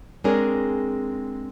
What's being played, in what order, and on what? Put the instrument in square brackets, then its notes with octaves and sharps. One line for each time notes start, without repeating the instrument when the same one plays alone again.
[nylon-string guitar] G#3 C4 D4 G#4 A#4 C#5